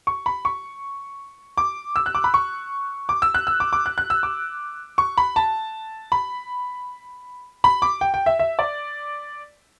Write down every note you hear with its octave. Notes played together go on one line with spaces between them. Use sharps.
C#6
B5
C#6
D6
E6
F#6
D6
B5
C#6
D6
E6
F#6
E6
D6
D6
F#6
F#6
E6
D6
C#6
B5
A5
B5
B5
D6
G5
G5
E5
E5
D5